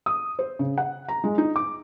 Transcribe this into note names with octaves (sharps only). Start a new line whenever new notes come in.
D#6
C5
C#3
F#5
A#5
G#3
D#4
D6